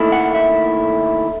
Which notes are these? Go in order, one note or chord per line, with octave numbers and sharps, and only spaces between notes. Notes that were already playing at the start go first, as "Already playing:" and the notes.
Already playing: D#2 D#3 A3 E4
F#5
E5